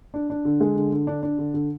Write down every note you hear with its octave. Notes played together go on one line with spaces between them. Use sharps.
D4
D4
D3
G#3
D3
D3
D4
D4
D3
D3